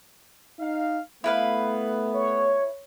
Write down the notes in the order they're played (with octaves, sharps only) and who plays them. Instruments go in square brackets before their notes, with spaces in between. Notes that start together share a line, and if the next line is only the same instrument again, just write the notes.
[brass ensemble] D#4 F5
[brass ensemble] A3 B3 [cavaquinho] E4 B4 F5
[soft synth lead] C#5